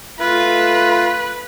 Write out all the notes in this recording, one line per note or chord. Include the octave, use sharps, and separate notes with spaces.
A3 F4 B4